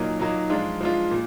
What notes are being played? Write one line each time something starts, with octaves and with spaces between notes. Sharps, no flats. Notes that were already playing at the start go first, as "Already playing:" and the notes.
Already playing: A#2 F#3 A#3 D#4
A#2 F#3 A#3 D#4
F3 G#3 D4 F4
F3 G#3 D4 F4
A#2